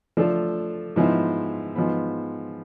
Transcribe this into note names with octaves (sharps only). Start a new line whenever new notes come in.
F3 A3 D4 F4 A4
G#2 F3 B3 E4
G#2 F3 B3